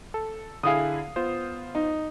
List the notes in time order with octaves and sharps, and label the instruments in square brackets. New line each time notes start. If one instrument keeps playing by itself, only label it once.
[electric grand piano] A4
[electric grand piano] D3 E4 G#4 [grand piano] F5 D#6
[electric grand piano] B3 F4 C5
[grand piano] D#4